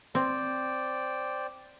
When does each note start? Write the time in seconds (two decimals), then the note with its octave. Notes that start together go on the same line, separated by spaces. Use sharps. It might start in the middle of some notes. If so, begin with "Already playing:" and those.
0.15 C4 C5 D5 G5